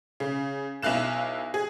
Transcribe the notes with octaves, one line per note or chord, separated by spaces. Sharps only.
C#3
B1 E4 F5 F#6 E7
G#4